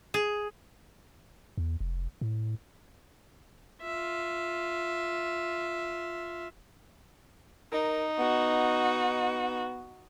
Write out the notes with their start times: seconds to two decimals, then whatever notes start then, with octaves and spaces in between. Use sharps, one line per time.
0.14 G#4
1.58 E2
1.80 F1
2.21 A2
3.82 F4 E5
7.72 D#4 A#4
8.19 B3 F#4